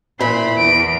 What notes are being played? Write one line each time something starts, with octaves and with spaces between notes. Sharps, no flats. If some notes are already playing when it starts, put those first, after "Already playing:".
A#2 E3 C5 B5
E2 D7